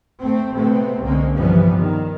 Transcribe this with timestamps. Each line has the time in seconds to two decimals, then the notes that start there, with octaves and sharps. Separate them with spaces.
0.20 A3 C4
0.54 C3 G#3 A3 B3 C4
1.01 C2 D3 G#3 A#3 C4 C#4
1.34 G2 C3 E3 F3 G3 B3
1.77 D#3